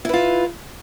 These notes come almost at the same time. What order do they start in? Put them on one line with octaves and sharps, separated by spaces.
E4 B4 F4